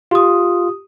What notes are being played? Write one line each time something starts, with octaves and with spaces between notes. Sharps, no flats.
F4 G4 D#6